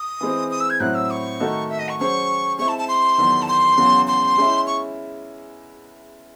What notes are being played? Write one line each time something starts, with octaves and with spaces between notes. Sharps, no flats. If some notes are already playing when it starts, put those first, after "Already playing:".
Already playing: D#6
E3 G#3 C4
D#6
E6
G#6
A2 F#3 C4 E4 F#6
E6
C#6
D#3 A3 D#4 F#4 A4
E5
D#5
C#6
F#3 C#4 G#4 C5 C#6
G#3 C4 E4 C#6
A5
A5
C6
E2 D#3 F#3
A5
C6
E2 C#3 F#3
C6
G#3 C#4 E4
C#6